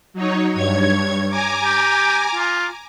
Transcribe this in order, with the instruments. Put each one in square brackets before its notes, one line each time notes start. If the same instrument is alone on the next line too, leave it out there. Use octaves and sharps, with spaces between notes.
[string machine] F#3 D#4 C#5
G2 C#5 G#6
G#5 A#5 D6
[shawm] G4
F4